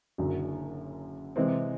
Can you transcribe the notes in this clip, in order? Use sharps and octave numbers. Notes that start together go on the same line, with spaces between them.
F#1 F#2 D3 F#3
C3 E3 G#3 C4